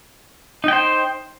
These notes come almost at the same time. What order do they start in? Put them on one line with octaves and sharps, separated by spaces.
D#4 G5 C5